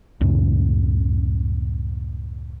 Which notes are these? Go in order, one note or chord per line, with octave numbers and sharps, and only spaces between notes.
C#2 F#2 A2 C#3